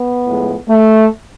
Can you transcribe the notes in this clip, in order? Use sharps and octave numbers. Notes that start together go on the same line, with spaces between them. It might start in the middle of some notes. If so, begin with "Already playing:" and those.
Already playing: B3
A2 F3 G#3
A3